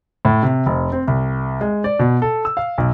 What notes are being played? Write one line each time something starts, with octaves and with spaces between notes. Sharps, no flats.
A2
C3
F1
C4
C2
G#3
D5
B2
A4
E6
F5
B1